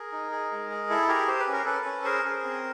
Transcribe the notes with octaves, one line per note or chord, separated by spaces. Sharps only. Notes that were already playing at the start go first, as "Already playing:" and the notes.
Already playing: G#4 A#4
D#4
G#4
G#3
G#4
E4 A4
G4 G#4 A#4
G4 C5
B4
C#4
A#4
C#4 A4 B4
C#4
G#4 A#4 C5
G#4
C4